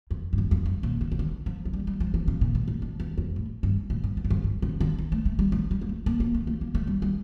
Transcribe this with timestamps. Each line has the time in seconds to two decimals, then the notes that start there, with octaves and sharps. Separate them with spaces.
0.11 F2
0.33 G2
0.38 F2
0.51 F2
0.66 G2
0.83 A#2
1.01 C#3
1.12 C#3
1.19 D3
1.46 F3
1.65 F3
1.73 G3
1.87 G3
2.00 F3
2.14 E3
2.28 C#3
2.41 A#2
2.55 A#2
2.68 A2
2.82 F2
3.00 E2
3.18 F2
3.36 A2
3.63 G2
3.90 A2
4.04 G2
4.17 F2
4.25 G2
4.30 F2
4.44 G2
4.62 C#3
4.80 D3
4.99 E3
5.12 A3
5.25 A3
5.39 G3
5.52 A3
5.71 G3
5.81 A#3
5.89 A3
6.06 A#3
6.20 A#3
6.34 A3
6.47 A3
6.61 A#3
6.75 A3
6.87 G3
7.02 G3